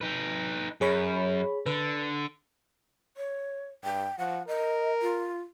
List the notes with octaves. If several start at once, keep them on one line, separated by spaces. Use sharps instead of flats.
D#4 B4
F#2 G#4 C#5 B5
D3 B4
C#5
G2 G5
F3 F#5
A#4 D#5
F4